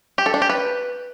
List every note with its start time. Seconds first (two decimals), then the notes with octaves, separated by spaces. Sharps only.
0.18 G4
0.26 A4
0.34 D4
0.42 G4
0.50 B4